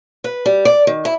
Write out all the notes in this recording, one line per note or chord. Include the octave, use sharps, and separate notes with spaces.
B4
G3
D5
D#3
E4